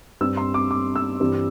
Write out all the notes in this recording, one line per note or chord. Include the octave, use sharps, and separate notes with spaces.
G2 G3 C4 E6
C6
D6
D6
E6
G2 E3 G3 C4